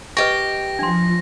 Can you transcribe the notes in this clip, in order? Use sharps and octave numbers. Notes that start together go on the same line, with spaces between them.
G4 B4 D#5 G5 C#6 A#6
F3 D4 C6